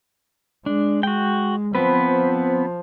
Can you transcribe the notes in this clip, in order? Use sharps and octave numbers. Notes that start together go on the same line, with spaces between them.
G#3 D4
F#4 G5
F3 B3 C4 B4